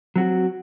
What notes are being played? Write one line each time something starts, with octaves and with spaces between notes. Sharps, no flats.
F#3 C4 F#4